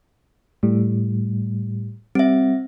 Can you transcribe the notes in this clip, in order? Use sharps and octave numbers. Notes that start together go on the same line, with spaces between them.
A2 G3
G3 C4 E5